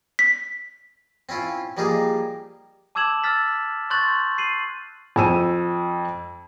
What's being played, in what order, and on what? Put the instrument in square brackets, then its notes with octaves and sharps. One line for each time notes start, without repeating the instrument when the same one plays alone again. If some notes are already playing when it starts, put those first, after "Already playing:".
[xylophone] B6
[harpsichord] C4 C#4 E4 F4
F3 G3 A#3 D#4 G4 G#4
[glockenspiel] A5 D6 E6 G#6 E7 F#7
E6 F6 A6 B6
C6 C#6 F#6 G6 A6 F#7
C7 D#7 F#7
[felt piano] F2 E6 D#7